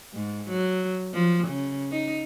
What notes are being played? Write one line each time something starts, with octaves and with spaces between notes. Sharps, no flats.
G#2
F#3
F3
C#3
D#4